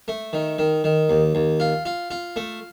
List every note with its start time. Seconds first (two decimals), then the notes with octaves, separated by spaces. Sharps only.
0.08 A3
0.33 D#3
0.58 D#3
0.84 D#3
1.10 D#2
1.35 D#2
1.60 F4
1.85 F4
2.11 F4
2.36 A3